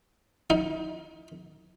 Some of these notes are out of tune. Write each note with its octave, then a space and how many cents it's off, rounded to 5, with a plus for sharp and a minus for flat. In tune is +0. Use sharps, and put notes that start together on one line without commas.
D#4 +30